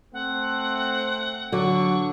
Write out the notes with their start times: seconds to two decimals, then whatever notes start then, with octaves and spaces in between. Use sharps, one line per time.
0.14 A3 C4 F#5
1.52 D3 F#3 C#6